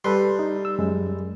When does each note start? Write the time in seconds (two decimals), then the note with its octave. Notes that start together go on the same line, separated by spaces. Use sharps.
0.04 G3 A4 B4 C6
0.39 D#4
0.65 E6
0.79 F#2 G#3